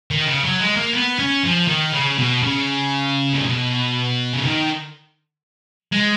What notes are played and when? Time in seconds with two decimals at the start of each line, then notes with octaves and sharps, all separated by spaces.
0.11 D#3
0.27 C#3
0.44 F#3
0.60 G#3
0.77 A#3
0.93 B3
1.19 C#4
1.44 F3
1.68 D#3
1.93 C#3
2.18 B2
2.43 C#3
3.34 A#2
3.43 B2
4.33 C#3
4.42 D#3
5.92 G#3